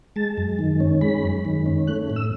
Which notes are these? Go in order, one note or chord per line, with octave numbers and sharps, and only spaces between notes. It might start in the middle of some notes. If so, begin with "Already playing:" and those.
G#3 A5
F#2
D#3
C#4
G#3 B5
F#2
D#3
C#4
A3 F#6
A2
E6